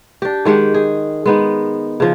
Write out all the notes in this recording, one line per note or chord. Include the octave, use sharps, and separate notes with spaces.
D4 G4
D#3 G#3 G4 F#5
G#4
G#3 B3 D#4
C#3 F3